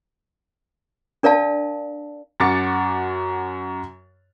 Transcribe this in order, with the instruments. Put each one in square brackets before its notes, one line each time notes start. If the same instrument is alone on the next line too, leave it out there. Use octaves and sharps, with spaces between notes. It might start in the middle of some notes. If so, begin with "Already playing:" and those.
[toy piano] D4 A#4 D5 F5 A5
[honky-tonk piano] F#2 F#4 D6 A6 C#7